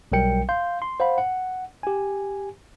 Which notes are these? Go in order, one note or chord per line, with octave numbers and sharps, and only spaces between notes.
B1 F#3 G3 A#4 G5 C#7
F5 C6 G6
C6
C5 F5 F#5 B5
F#5
G4 G#5